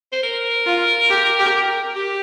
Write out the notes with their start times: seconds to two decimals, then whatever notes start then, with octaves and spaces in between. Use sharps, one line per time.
0.13 C5
0.23 A#4
0.66 F4
1.10 G4
1.39 G4
1.96 G4